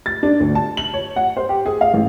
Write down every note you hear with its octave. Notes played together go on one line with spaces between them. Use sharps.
A6
D4
D2
A5
F#7
C#5
F#5
C5
G4
G#4
F5
A1